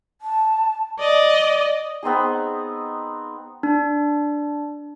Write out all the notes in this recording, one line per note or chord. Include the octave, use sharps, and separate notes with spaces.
A5
D5 D#5
B3 C4 D#4 G#4
D4